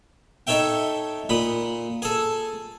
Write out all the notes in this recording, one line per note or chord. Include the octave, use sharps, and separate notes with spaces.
D#4 A4 C#5 E5 G5
A#2 B5 D#6
G#4 A4